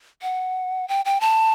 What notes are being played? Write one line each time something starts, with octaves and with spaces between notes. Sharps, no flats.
F#5
G5
G5
A5